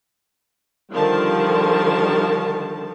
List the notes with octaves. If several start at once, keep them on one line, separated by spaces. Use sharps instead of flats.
D3 D#3 F3 G3 A#4 A5